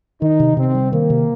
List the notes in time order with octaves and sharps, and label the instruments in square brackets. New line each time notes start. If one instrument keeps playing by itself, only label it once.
[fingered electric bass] D#3 [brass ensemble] D#4
[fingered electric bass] C3
[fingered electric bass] C3 [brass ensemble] C4
[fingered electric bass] G3
[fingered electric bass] D#3 [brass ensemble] A#3
[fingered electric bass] C3